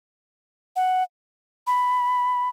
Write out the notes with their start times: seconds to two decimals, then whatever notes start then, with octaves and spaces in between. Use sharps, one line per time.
0.76 F#5
1.67 B5